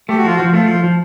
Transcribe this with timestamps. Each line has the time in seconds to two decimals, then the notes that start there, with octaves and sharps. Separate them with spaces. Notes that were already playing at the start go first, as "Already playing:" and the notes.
0.09 A3 G4
0.18 F#4
0.24 F3 F4
0.36 F#4
0.39 F3
0.53 A3 F4
0.69 F3
0.84 F3